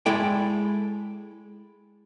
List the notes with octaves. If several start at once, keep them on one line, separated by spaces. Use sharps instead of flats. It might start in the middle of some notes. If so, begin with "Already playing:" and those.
G#3 E4 A4 D5 G5